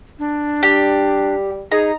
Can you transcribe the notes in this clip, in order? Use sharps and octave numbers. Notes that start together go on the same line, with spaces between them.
D4
G3 G4
D#4 G#4 A#5